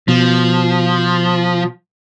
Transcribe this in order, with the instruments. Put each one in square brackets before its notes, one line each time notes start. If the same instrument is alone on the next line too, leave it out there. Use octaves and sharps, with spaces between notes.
[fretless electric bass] B2 [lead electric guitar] F3